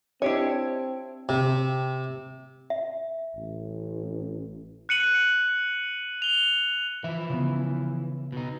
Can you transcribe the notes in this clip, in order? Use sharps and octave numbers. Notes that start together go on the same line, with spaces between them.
C4 D4 E4 G4 C#5 D#5
C3
E5
A1
F#6 C#7 D#7 F#7
F7 G7
E3 F3 E4 E5
C#3 B3
B2 D#4